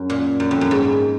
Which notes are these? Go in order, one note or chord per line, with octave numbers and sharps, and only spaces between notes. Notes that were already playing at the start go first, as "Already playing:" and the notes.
Already playing: F#2
A#2
F#2
F2
F#2
G#2